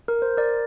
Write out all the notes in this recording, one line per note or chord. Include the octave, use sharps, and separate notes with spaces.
A#4
C5
A#4 D5